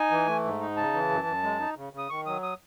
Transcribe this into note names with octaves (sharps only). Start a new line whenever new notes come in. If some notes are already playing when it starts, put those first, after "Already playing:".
Already playing: D#4 G#5
E3
A3
G#2
D#4
C#3 A5
E3
F#2
F#2
G#3
D#4
C#3
C#3
D#6
D#3 C#6
F#3 D#6
D#6